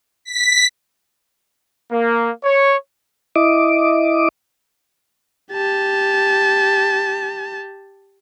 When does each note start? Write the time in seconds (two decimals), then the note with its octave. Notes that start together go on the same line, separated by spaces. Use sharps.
0.24 B6
1.92 A#3
2.43 C#5
3.36 E4 D#5 D6
5.52 G4 A5